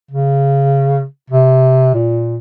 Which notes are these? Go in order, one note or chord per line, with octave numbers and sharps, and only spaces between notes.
C#3
C3
A#2